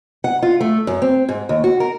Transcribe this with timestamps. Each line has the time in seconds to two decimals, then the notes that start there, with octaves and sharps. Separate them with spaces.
0.24 F#5
0.42 F4
0.61 A3
0.87 F#2
1.02 C4
1.29 G#2
1.49 D#2
1.64 F#4
1.80 A#4